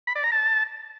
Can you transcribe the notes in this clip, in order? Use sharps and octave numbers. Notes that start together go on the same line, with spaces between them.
B5
D5
A#5
A5